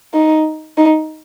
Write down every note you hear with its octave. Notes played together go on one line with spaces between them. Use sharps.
D#4
D#4